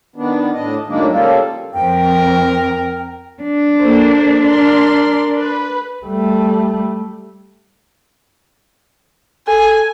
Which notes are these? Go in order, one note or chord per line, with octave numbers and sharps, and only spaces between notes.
D#3 B3 D4
A2 D4 D#5
F#2 A2 D#3 G#3 A#3 D4
C#3 G3 A#3 F4 A4
F2 A#4 G5
D4
A#3 A4 C5
A#4 D5 C6
B4
G3 A3
A4 G#5